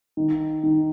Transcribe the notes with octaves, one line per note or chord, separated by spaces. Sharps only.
D#3
D#3